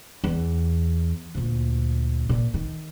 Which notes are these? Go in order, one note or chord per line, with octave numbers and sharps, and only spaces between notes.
E2
D2 A#2
A#2
D#3